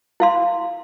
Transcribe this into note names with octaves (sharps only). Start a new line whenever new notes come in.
E4 F5 C6